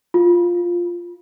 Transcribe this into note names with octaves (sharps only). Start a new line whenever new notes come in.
F4